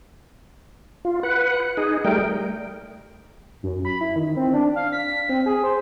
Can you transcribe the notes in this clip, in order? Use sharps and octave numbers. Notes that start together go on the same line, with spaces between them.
F4
B4 F#5
D#4 G#4
G3 A3 A#4 G5
F#2
B5
E4
D#3
C4
D4
F5
B6
C4
G#4
C5